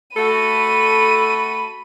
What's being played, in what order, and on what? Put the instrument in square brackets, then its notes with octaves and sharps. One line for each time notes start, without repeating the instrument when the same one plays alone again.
[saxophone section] A3 F#4 A4 [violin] B5 D#7